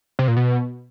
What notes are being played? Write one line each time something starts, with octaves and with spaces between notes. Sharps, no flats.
C3
A#2
B2